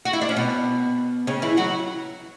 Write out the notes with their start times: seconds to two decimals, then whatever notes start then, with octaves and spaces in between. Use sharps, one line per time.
0.05 F#4
0.13 E4
0.21 D4
0.29 C#4
0.36 B2 B3
1.27 C#3 C#4
1.42 E3 E4
1.57 F#3 F#4